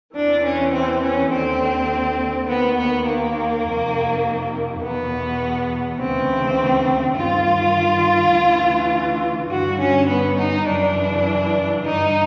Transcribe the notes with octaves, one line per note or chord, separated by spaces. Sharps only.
E2 C3 E3 D4
C#4
C4
C#4
D#2 D3 C4
D#2 D#3 B3
B3
A#3
F2 C3 D#3
E2 B2 B3
D2 C#3 E3 C4
G2 D#3 F4
D2 C#3 E3
G2 D3 F#4
C#4
B3
D#4
F#2 C#3 E3 D4
G2 D3 D#4